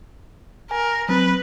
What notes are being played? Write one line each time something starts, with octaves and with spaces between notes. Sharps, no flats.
A#4 G#5
F#3 C4 B4